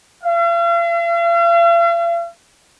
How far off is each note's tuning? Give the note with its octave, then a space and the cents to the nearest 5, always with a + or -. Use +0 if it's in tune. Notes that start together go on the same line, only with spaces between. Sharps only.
F5 -45